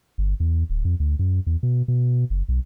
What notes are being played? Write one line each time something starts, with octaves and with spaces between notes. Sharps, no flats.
G1
E2
D1
F2
D2
F#2
E2
B2
B2
F#1
B1